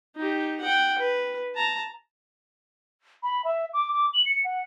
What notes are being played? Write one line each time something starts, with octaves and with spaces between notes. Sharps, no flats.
D#4 G4
F#5 G5
B4
A5 A#5
B5
E5
D6
D6
F#7
C#7
F#5